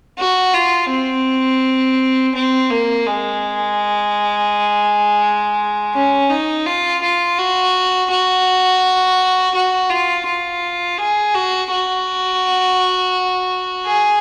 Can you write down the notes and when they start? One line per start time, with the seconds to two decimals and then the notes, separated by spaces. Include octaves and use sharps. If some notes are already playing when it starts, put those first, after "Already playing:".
0.18 F#4
0.54 F4
0.90 C4
2.35 C4
2.70 A#3
3.06 G#3
5.94 C#4
6.30 D#4
6.66 F4
7.02 F4
7.38 F#4
8.10 F#4
9.54 F#4
9.90 F4
10.26 F4
10.98 G#4
11.34 F#4
11.70 F#4
13.86 G#4